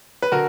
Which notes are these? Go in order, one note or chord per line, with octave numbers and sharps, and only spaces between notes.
B4
D3 F#4 A#4